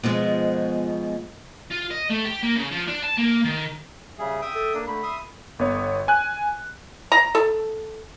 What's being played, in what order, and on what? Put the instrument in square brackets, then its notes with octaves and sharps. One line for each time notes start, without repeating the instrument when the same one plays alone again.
[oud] B2 F3 G#3
[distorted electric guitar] F4
D#5
A3
G4
A#3
C#3
F3
D4
A5
A#3
D#3
[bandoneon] C#3 G3 G#4 [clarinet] E5
[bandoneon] E5 G5 D#6
[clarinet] A4
[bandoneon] A#3 D4
[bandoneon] D3 A3 [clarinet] B5
[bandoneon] E5 C6 D#6
[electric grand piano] G1 B3 C#5
G#5 F#6
[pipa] A#5
A4